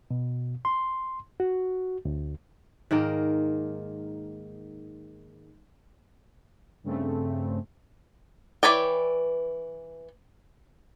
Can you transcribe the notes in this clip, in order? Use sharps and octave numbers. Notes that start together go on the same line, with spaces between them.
B2
C6
F#4
D2
G#2 D#3 A#3 A#4
G2 C#3 A3 C4
E3 B4 C#5 D5 G5